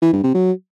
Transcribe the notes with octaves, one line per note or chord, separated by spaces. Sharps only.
E3
G2
C3
F#3